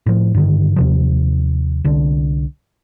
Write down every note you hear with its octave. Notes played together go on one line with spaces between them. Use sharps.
A2 F3
G2 D3 D#3
D#2 C3 F3
C2 D3